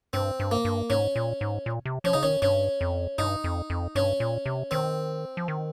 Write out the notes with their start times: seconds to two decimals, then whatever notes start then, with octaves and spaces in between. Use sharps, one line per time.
0.13 G2 C4
0.40 G2
0.51 A#3
0.65 G2
0.90 G#2 C#4
1.16 A#2
1.41 G#2
1.66 A#2
1.85 C3
2.04 F3 C#4
2.13 C#3 D#4
2.23 D#3 C#4
2.42 G2 C#4
2.81 F2
3.18 G2 D#4
3.44 F2
3.70 F2
3.95 G2 C#4
4.20 A#2
4.46 C3
4.71 D#3 C4
5.37 F3
5.48 D#3